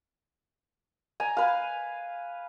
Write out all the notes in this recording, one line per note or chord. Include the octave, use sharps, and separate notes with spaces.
G#5 A#5
B4 F5